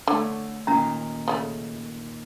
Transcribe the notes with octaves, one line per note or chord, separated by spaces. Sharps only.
D3 A3 C#5
A#2 D#3 C#4 A#5
C#3 G#3 A3